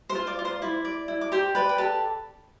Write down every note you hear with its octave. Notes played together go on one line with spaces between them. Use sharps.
C5 C6
F4
D5 D6
F4
C5 C6
E4 D5 D6
D5
E4
D6
G4 C5 C6
B4 D5 B5
G5
G4 A4 A5